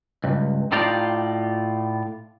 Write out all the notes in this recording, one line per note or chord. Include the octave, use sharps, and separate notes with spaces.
C#2 G2
A2 D#4 F4 G4 D5 F5